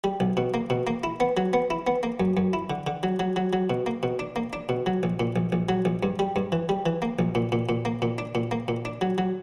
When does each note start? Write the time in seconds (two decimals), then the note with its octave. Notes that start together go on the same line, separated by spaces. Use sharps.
0.04 G3
0.20 B1
0.37 B2
0.54 A#3
0.70 B2
0.87 A#3
1.04 E4
1.20 B3
1.37 F#3
1.53 B3
1.70 E4
1.87 B3
2.03 A#3
2.20 F#2
2.37 F#2
2.53 E4
2.70 D3
2.87 D3
3.03 F#3
3.20 F#3
3.36 F#3
3.53 F#3
3.70 B2
3.86 A#3
4.03 B2
4.19 D4
4.36 A#3
4.53 D4
4.69 B2
4.86 F#3
5.03 A#1
5.20 A#2
5.36 A#1
5.52 A#1
5.69 F#3
5.85 A#1
6.03 G2
6.19 G3
6.36 G2
6.52 E3
6.69 G3
6.86 E3
7.02 A#3
7.19 A#1
7.35 A#2
7.52 A#2
7.69 A#2
7.85 A#3
8.02 A#2
8.18 D4
8.35 A#2
8.51 A#3
8.68 A#2
8.85 D4
9.01 F#3
9.18 F#3